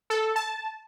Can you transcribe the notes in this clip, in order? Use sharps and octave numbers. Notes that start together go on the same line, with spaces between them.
A4
A5